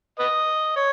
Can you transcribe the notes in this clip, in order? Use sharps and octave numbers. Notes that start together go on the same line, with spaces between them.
B4 D#5
C#5